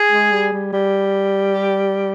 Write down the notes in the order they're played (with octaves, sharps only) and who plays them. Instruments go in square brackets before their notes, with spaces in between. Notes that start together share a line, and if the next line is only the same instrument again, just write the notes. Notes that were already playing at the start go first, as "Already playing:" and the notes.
Already playing: [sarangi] G#4
[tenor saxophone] G#3
G3
G3
G3
[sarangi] G4